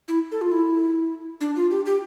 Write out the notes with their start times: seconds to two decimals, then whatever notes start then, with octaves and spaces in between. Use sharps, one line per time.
0.08 E4
0.32 A4
0.41 F4
0.51 E4
1.41 D4
1.56 F4
1.71 G4
1.86 G4